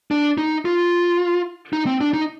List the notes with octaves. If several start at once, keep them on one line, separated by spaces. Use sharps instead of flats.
D4
D#4
F4
D#4
C4
D4
D#4